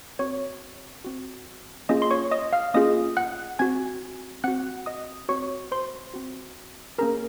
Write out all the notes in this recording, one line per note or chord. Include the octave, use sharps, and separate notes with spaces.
C4 F#4 C#5 C#6
C4 F#4
A#3 C#4 F4 G#4 D#5 D#6
C6
C#5 C#6
D#5 D#6
F5 F6
A#3 C#4 F4 G#4 D#5 D#6
F#5 F#6
C4 F#4 G#5 G#6
C4 F#4 F#5 F#6
D#5 D#6
C4 F#4 C#5 C#6
C5 C6
C4 F#4
A#3 C#4 G#4 A#4 A#5